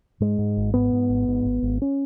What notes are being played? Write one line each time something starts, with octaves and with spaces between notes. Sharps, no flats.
G#2 G#3
G#2
G#1
G#2 B3
G#2
G#1
G#2
G#1
G#1
C#4